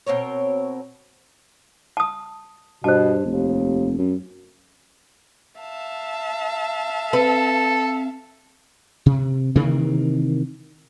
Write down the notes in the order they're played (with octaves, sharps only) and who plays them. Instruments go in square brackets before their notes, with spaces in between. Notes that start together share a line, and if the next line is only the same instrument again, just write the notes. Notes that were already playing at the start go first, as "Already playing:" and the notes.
[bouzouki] B2 C4 A#4 C#5
[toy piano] A5 D#6
[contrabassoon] G2 [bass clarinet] B2 [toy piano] C5 A5
[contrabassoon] F1 [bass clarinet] D#2
[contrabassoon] F#2
[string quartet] E5 F5 A5
[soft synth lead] C4 [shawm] A4 [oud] B4
[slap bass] C3
C3 D#3 E3 A#3